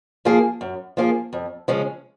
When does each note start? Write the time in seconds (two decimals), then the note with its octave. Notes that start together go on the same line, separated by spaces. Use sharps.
0.25 F3 A#3 F4 G#4
0.61 F#2
0.97 F3 A#3 F4 G#4
1.33 F2
1.68 C#3 F3 G#3 C#4